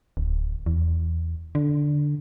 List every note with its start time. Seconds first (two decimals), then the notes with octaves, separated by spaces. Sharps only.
0.17 D1
0.66 E2
1.55 D3